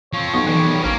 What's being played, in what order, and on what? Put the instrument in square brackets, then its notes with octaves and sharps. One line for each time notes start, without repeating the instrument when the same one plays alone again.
[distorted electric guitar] F3 C4 [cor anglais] C#5
[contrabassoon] B1 [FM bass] B3 [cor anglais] C#5
[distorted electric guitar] D#3 G3 [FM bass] E3
[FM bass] A#1 [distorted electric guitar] A#3 [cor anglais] C#4